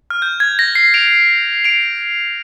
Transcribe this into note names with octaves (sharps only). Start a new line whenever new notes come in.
F6
G6
G#6
A#6
C7
D7 F7
D7 F7